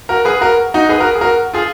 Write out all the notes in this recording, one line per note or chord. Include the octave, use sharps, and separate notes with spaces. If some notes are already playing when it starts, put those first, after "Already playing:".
F#4 A#4
G#4 B4
F#4 A#4
D#4 F#4
G#4 B4
F#4 A#4
G#4
F#4 A#4
F4 G#4